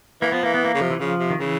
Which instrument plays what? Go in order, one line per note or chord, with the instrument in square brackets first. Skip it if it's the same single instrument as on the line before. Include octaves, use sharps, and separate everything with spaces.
[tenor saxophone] E3 [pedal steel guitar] A#3
[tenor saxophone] F3 [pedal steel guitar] B3
[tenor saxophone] E3 [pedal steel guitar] A#3
[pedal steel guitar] B3
A#3
[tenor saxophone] C#3
[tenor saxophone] C3 [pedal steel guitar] F3
[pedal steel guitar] E3
[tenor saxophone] C#3 [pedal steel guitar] F3
[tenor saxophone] C3
[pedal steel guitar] D#3
[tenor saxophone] C#3 [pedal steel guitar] E3